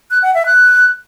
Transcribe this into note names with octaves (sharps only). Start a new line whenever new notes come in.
F#6
F#5
E5
F#6